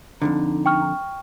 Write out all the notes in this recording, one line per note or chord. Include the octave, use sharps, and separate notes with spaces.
F2 G#2 D3 D#4
G5 C#6 F6